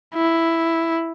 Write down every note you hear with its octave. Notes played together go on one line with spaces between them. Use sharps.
E4